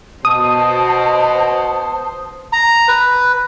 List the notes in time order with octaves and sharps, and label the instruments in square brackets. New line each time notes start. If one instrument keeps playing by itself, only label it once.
[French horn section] B2 [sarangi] C5 [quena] A5 [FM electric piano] D#6
[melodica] A#5
B4